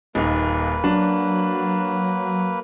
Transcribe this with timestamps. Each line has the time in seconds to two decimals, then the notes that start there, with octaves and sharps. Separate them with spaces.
0.15 D#1 D#2 A#3 D#4 B4
0.84 F#3 D4